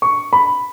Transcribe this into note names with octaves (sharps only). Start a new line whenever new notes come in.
C#6
B5